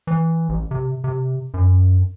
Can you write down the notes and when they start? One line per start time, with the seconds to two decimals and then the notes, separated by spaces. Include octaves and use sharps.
0.07 E3
0.49 A1
0.71 C3
1.04 C3
1.54 F#2